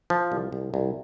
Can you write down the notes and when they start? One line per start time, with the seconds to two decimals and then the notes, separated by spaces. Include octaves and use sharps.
0.10 F3
0.32 C2
0.52 C2
0.74 C2